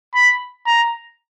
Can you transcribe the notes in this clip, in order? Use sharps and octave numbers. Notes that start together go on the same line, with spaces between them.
B5
A#5